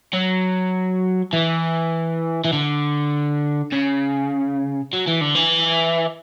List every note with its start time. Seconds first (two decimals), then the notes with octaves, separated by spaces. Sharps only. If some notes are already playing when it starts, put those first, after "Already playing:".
0.13 F#3
1.33 E3
2.44 E3
2.53 D3
3.72 C#3
4.93 F#3
5.07 E3
5.21 D3
5.35 E3